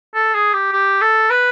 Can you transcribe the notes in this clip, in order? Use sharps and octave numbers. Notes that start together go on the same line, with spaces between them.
A4
G#4
G4
G4
A4
B4